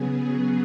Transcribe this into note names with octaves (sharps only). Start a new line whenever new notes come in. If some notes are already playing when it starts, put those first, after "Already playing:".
Already playing: C#3 F#3 B3 G#4
G#4